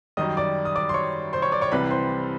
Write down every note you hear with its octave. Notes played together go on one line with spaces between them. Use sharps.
F#2 D#3 G3 D#5 D#6
D5 D6
D#6
D5 D6
C6
C#5 C#6
C5 C6
C#5 C#6
D5 D6
C#5 C#6
C2 C3 E3 G3 B4 B5
C5 C6